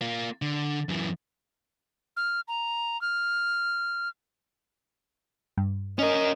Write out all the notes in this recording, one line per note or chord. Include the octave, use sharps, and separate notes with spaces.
A#3 F4
D3
F#2 E3
F6
A#5
F6
G2
C#4 A#4 D#5